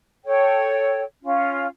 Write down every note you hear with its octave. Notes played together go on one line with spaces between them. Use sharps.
A4 C#5 G5
C#4 F4